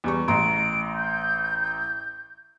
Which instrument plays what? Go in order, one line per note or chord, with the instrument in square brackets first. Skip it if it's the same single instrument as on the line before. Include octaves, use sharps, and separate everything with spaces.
[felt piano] E2 G3 C#6
[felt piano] A1 A#5 C6 [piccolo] D7
[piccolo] G6